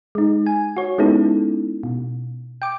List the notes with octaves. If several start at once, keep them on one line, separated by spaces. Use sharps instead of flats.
G#3 D#4
G#5
F#4 C#5
G#3 B3 C#4 D#4 E4 A4
B2
G5 D6